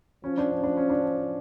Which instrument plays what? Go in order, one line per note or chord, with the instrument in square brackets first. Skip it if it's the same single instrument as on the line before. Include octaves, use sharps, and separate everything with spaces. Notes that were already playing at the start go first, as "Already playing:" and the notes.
[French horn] F3 [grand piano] C#4
[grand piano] D4
C#4
D4
C#4
D4